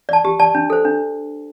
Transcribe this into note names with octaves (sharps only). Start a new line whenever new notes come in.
D5 A5
G4
D5 A5
D4
A4 C5
D4